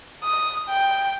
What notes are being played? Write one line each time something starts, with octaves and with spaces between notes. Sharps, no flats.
D#6
G5